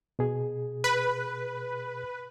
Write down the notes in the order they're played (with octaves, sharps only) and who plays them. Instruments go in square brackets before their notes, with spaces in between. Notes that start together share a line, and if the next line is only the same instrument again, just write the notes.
[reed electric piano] B2 G#4
[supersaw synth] B4